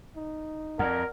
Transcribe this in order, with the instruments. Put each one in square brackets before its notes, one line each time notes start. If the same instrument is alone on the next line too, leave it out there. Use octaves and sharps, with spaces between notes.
[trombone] D#4
[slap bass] F2 [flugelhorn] A#4 [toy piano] D5 F#5